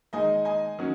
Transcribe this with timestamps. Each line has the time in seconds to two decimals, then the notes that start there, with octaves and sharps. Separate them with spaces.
0.13 D#3 G#3 D#4 D#5 G#5
0.45 D#5 G#5
0.79 D#3 F#3 C#4